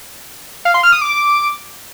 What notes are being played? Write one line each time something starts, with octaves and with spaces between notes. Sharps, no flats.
F5
C6
F6
D#6
D6